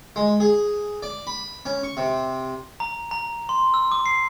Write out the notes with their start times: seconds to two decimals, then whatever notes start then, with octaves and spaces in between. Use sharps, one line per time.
0.16 G#3
0.40 G#4
1.03 D5
1.27 B5
1.66 C#4
1.83 C#6
1.97 C3
2.80 A#5
3.11 A#5
3.49 C6
3.74 E6
3.92 D6
4.06 C7